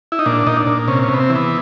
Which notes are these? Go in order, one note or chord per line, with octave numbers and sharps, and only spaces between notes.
E4
D#4
A#2 D4
A#2 D#4
D4
A#2
C3 C#4
C#4
C3
B3
C4
E3
B3